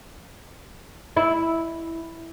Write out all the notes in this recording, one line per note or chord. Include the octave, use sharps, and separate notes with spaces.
E4